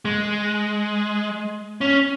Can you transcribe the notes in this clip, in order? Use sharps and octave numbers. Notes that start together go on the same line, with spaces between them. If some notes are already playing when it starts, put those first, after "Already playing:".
G#3
C#4